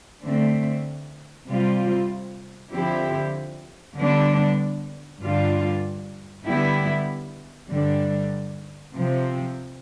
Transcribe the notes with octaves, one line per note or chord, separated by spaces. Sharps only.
D3 A3 C4
C3 G3 C4 F4
D3 F3 C4 E4 G4
D3 G3 B3 D4
G2 D3 G3 D4 F4
D3 G3 B3 E4 G4
G2 D3 G3 D4
C3 F3 C4